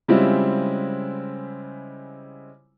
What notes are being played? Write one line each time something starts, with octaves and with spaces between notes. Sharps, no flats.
C#3 G3 G#3 C4 E4 F4